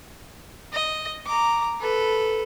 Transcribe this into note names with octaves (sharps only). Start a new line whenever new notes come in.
D#5
A#5 D6
A4 B4